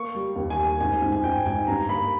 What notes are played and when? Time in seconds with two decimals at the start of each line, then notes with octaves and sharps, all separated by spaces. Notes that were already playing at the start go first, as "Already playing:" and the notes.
Already playing: A#3 C#6
0.15 G3
0.36 D#2
0.50 G#5
0.58 A#3
0.65 G#5
0.80 G#2 G#5
1.02 G#2
1.12 G#5
1.24 G#2 G5
1.46 G#2 G#5
1.67 G2 A#5
1.89 A#3 B5